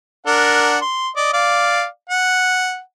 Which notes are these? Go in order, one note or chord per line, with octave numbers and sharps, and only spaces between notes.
D4 A#4 F#5
C6
D5 D#5
D5 F5
F#5